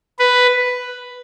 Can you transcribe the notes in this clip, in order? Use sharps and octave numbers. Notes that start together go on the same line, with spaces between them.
B4